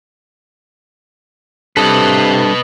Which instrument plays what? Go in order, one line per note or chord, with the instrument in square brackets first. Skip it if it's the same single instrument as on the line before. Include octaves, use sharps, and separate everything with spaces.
[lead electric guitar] G2 [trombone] C3 [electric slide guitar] A4 [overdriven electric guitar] B4 D#5